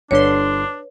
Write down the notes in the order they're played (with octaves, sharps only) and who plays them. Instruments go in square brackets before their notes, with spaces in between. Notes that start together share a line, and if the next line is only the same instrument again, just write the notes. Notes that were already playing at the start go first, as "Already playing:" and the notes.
[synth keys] G1 D3 C6 [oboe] D4 [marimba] B4 C#5